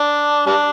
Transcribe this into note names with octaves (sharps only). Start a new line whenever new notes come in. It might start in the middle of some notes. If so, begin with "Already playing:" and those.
Already playing: D4
G3 D4